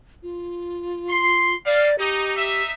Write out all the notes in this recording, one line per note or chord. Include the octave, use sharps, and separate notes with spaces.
F4
C6
G3 D5 F5
D#4 G4
D#4 E5